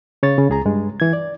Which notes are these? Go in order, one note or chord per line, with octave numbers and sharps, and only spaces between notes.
C#3 C#5 A6
C#3
C#2 G#4 A#5
G2 G#3
E3 G#6
D5